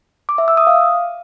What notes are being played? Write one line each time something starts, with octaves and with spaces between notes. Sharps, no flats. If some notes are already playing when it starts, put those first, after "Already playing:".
D6
E5
E6
D#6
F5